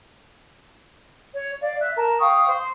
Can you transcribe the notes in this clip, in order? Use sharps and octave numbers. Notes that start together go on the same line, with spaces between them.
C#5
D5 F5
E5 F#6
A#4 A5
F5 G5 C#6 D#6
C5